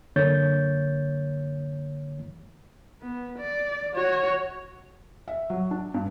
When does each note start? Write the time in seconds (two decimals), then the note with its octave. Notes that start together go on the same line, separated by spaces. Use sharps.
0.16 F#2 D3 A#3 C#5 G6 A6
3.02 B3
3.38 D5
3.95 F#4 C#5
5.28 E5
5.50 F#3
5.71 D4
5.94 G2